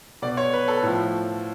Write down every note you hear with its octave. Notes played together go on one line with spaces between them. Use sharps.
B2 D5
C#5
B4
A4
A2 F3